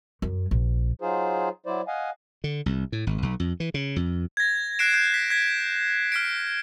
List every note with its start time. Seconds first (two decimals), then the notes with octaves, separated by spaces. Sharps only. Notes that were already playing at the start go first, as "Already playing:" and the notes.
0.22 F#2
0.51 A#1
1.02 F#3 D#4 F4 G#4 C5
1.66 F#3 E4 C5 D5
1.88 D#5 F5 F#5 G#5
2.44 D3
2.66 C2
2.92 A2
3.07 G#1
3.23 B1
3.40 F2
3.60 E3
3.74 C#3
3.96 F2
4.37 G#6 A#6
4.79 F#6 A#6 C7 D7 E7
4.94 G6 C7
5.14 B6
5.30 G#6 B6
6.12 F6 B6 D7